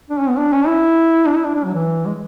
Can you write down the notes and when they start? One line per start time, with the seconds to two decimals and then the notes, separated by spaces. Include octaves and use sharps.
0.10 D4
0.20 C#4
0.28 B3
0.38 D4
0.53 C#4
0.67 E4
1.26 D4
1.36 E4
1.45 D4
1.55 D4
1.64 F#3
1.74 E3
2.06 G#3